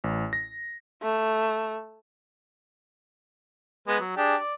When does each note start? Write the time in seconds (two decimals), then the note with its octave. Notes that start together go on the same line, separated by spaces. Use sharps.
0.04 A1
0.33 A#6
1.02 A3
3.88 G#3 B3
4.00 F#3
4.17 D4 G4 G#4
4.38 D5